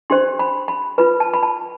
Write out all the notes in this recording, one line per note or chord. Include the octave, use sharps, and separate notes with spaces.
D4 G4 C5 C6
B5
B5
F4 B4 B5
A5
B5
A5